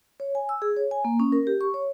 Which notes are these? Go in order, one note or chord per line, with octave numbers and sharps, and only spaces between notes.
C#5
G#5
E6
G#4
C#5
G#5
A#3
C#4
A#4
G4
C#6
C#5